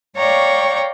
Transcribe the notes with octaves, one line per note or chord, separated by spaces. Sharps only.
C#5 D5 F5 G5 A#5 C#6